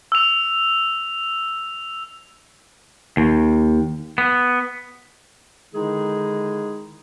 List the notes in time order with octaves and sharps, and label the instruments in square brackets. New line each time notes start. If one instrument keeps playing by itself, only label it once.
[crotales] E6 F7
[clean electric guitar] D#2
B3
[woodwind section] D3 D#3 G#3 D#4 E4 G#4